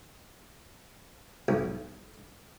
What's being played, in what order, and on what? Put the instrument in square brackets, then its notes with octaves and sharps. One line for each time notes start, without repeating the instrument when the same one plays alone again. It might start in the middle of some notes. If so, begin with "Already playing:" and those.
[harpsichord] B1